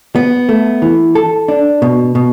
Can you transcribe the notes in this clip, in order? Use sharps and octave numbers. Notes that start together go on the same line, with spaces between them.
B3
A3
E3
A4
D4
B2
B2